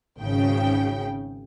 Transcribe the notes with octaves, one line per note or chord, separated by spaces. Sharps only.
G#1 C#3 G5